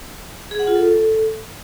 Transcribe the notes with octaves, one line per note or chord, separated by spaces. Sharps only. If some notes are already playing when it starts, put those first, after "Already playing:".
G#4
F#5
F4
A4